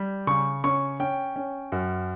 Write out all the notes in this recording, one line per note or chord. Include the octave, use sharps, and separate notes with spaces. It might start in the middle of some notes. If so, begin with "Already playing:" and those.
Already playing: G3
C#3 C#6
C#4 C#6
C#4 G5
C#4
F#2